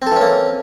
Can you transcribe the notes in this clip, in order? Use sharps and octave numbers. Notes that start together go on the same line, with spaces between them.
E3 A#3 C4 C#4 A4